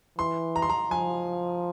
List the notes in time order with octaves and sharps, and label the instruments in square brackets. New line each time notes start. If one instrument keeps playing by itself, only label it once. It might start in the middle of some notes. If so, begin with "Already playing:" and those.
[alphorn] E3 [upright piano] C6
[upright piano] A#5
C6
A#5
[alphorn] F3 [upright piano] G#5